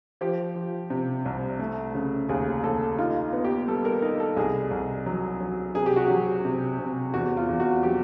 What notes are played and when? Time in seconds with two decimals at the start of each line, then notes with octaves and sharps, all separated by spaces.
0.21 F3 G4
0.55 F3
0.90 C3
1.25 C2
1.59 A3
1.95 C#3
2.29 D#2 G#4
2.64 D#2 A4
2.98 D#4 F4
3.33 B3
3.44 G4
3.67 G3 A4
3.85 A#4
4.02 D#4 A#4
4.20 A4
4.37 C2 G#4
4.71 C2
5.06 F#3
5.40 F#3
5.75 C3 G#4
5.86 G4
5.96 F#4
6.07 F#3 G4
6.45 C3
6.79 C3
7.14 E2 F#4
7.37 F4
7.49 E2
7.60 F#4
7.83 F#3 G4